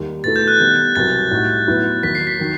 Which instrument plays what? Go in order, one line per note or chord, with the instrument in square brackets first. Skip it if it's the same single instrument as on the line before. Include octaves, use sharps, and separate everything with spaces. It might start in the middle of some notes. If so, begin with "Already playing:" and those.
Already playing: [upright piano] D#2 D#3 G3
[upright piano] B2 A3 E4 A4 [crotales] A6
[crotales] G6
F#6
[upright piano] D#3 G3 B3 D#4
[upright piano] C2 B2 F#3 [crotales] A6
[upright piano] A2 G3 D#4 F#4
A2 F#3 B3 E4 B4
[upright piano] D#2 D#3 F#3 [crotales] B6
[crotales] C7
B6
[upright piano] D#3 F#3